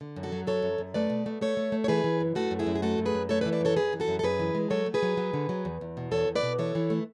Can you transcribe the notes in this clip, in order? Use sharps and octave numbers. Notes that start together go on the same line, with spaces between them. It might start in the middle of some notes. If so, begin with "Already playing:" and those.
D3
F#2
F#4 A4
F#3
F#2 A4 C#5
F#2
F#2
A3 B4 D5
B2
A3
A3 A4 C#5
A3
A3
C#5
E3 G#4 B4
E3
F#2
A3 F#4 A4
F#2
E4 G#4
F#2
G#4
A3 F#4 A4
F#2
G#4 B4
F#2
A3 A4 C#5
B4 D5
E3
B4 D5
F#2 A4 C#5
F#2 G#4 B4
E3
F#4 A4
F#2
A4
F#2 G#4 B4
E3
G#3
F#3 A4 C#5
A3
G#4 B4
F#3
F#3
D3
F#3
E2
E2
B2
E2 A4 C#5
E2
B4 D5
B2
E3 A4 C#5
E3
A3